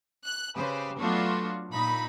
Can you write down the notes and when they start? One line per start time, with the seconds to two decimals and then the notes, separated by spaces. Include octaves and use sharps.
0.25 F#6
0.55 C#3 G4 B4 C5
0.99 F#3 A3 B3 D4 F4 F#4
1.72 A#2 D#4 B5